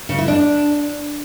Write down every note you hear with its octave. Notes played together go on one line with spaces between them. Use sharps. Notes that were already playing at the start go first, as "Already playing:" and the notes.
C#3
E4
D4